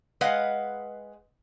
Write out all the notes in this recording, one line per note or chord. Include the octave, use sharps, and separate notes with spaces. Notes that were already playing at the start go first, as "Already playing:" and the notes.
G#3 B4 D#5 F5 F#5